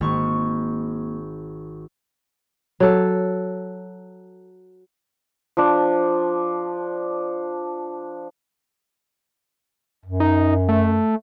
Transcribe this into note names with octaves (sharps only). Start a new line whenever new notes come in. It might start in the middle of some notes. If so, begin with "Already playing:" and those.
G#1 A#3 C#6
F#3 A4
F3 D4
F#2
D#4
A3